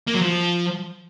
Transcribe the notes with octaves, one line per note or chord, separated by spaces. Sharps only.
A#3
F#3
F3